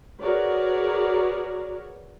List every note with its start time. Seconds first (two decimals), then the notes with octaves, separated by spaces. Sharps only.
0.21 F#4 G#4 A#4 B4 C#5 D5